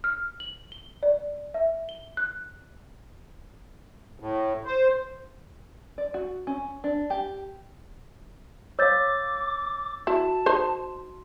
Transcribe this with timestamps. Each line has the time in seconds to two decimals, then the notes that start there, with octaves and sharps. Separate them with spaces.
0.04 F6
0.40 F#7
0.72 G7
1.03 D5
1.54 E5
1.89 G7
2.17 F#6
4.20 A2
4.65 C5
5.98 D5
6.14 F#4
6.47 C#4
6.84 D4
7.10 G4
8.79 C#5 F5 D6 E6 G6 A6
10.07 E4 F#4 A5
10.46 D#4 C5 C6